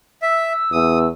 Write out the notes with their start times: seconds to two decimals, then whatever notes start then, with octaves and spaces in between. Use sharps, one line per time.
0.22 E5 E6
0.72 E2 D#6